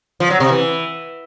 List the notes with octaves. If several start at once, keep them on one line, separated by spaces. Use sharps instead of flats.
F3
F#3
C3
E3